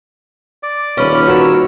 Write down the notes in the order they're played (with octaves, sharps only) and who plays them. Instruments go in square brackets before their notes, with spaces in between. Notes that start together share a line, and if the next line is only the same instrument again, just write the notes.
[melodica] D5 D6
[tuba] D#1 [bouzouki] C#4 B4
[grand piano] F#4 [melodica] A#4 C#5 E6